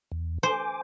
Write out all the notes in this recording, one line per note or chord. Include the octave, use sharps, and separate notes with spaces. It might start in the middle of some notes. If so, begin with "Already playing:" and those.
E2
C5 G#5 D6